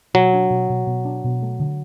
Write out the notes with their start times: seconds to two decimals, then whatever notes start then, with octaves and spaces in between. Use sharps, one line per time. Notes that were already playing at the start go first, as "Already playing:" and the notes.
0.14 B2 F#3
0.33 D4
0.50 B2
0.70 B2
0.87 B2
1.05 D4
1.24 B2
1.43 A3
1.60 D3